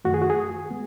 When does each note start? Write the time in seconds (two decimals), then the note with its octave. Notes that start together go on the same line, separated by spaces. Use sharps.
0.05 F#2 D#3 A3 F#4
0.14 G#4
0.22 F#4
0.30 G#4
0.71 G#3 B3